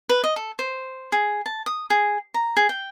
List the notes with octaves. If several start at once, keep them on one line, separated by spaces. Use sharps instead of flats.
B4
D#5
A4
C5
G#4
A5
D#6
G#4
A#5
G#4
G5